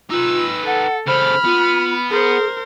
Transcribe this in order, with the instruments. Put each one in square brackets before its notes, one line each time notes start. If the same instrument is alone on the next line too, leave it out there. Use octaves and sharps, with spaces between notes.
[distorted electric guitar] D#4 B4 [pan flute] F4 [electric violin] E6
[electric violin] A4 [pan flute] F#5
[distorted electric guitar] C#3 A4 [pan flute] C5 [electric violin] B5 F6
[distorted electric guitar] B3 [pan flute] F4
[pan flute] G#4 [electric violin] A#4 C5